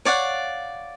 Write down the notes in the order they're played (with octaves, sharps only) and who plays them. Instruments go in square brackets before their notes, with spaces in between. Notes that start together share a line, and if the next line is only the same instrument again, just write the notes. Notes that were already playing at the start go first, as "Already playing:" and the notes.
[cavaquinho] C#5 D5 F5 F#5